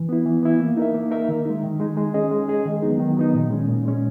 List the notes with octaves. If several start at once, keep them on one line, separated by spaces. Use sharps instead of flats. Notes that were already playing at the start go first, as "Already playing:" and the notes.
Already playing: E3
B3 E4
E3
B3 E4
A#3
D#4 A#4 E5
A#3
D#4 A#4 E5
D#3
G#3 D#4
D#3
G#3 D#4
G#3
C#4 G#4 D#5
G#3
C#4 G#4 D#5
D#3
F#3 B3 D#4
D#3
F#3 B3 D#4
A#2
G#3 C#4
A#2
G#3 C#4